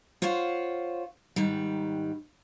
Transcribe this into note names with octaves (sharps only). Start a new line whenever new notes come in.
F4 C5 C#5 F5 F#5
G#2 D#3 G3